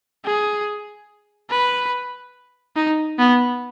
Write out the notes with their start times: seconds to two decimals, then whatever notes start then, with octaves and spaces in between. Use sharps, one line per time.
0.25 G#4
1.50 B4
2.76 D#4
3.19 B3